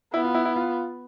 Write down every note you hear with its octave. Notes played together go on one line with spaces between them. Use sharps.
B3 E4
F4
E4
E4
F4